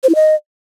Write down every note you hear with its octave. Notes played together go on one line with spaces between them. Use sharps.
C5
E4
D#5